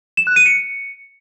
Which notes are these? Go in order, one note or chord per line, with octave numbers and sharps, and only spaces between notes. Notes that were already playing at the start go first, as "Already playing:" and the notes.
E7
F#6
D#7
C#7